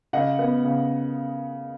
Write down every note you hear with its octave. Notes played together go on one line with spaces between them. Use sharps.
C#3 D#5 F#5
B3
C#3